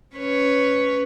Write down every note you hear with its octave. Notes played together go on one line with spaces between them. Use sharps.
C#4 B4 C#5